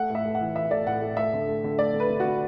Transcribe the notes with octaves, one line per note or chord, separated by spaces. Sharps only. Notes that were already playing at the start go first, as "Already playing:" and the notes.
Already playing: A3 F#5
A2 E5
A3
F#5
E3
E3 E5
A3 D5
A2 F#5
A2
A3 E5
D3
A3
D3
A3 D5
D3
B4
D3
F#4
D3